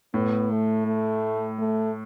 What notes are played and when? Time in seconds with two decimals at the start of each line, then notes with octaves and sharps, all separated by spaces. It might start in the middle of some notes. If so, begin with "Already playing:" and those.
0.14 A2 B3
0.50 A3
0.86 A3
1.59 A3